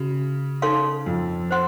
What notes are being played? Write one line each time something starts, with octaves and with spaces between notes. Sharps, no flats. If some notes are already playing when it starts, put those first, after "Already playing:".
Already playing: C#3 F#4
D#4 A4 C#5 F5 C6
F2
C5 F#5 C6